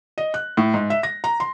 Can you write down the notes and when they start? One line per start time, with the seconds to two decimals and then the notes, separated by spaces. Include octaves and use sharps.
0.18 D#5
0.34 F#6
0.57 A2
0.74 G#2
0.90 E5
1.03 A#6
1.24 A#5
1.40 C6